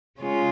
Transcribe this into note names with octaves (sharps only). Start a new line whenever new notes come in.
C#3 G#3 C#4 F4